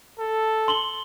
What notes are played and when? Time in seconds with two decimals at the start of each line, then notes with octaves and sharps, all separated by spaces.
0.19 A4
0.68 C6 F#7 G7